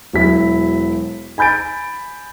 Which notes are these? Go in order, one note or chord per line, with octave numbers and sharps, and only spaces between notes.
E1 F#3 E4 B6
G#5 B5 G6 A6 D7